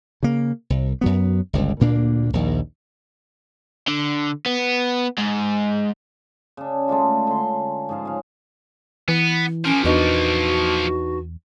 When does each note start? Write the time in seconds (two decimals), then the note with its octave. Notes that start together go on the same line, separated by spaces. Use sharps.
0.23 C#3 A#3
0.70 C2
1.01 F#2 F#3 B3
1.53 G1 C#2
1.80 D2 A#2 A#3 D4
2.33 A#1 D#2
3.88 D3
4.46 B3
5.18 G#2
6.57 C#3 D4
6.88 G#3 A3 D4 F4
7.27 D3 C#4 C6
7.89 G#2 F3 G#4 F5
8.05 C#3 F5
9.08 E3 B3
9.65 F3 A#3 C#4
9.85 E2 B3 D4 D#4 F#4